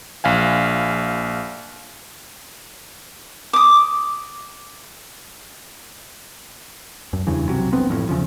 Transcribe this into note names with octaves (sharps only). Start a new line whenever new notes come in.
A#1 F5 G#5
D6 D#6
F#2
E2 G2 C#3 E3
B1 F#2 C3 F#3
F1 G2 B3 C4
D1 A1 F2 A2
E2 C#3 F3